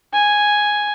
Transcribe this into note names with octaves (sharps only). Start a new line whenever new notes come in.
G#5